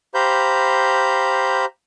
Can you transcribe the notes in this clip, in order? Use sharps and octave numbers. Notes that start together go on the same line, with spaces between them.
G4 C5 F5 A#5 B5 G6